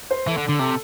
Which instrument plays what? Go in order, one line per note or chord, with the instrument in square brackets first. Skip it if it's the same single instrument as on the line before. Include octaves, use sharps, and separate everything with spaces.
[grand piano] C5
[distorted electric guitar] E3 [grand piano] A4
[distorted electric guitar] D3
D3
[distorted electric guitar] C3 [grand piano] A4